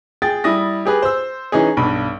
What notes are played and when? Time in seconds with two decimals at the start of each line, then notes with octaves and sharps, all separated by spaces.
0.22 G#4 G5 A6
0.44 G3 E4 D#6 A#6
0.85 G4 G#4 B4
1.02 C5 E6
1.52 E3 C#4 D#4 G#4
1.77 B1 G2 B5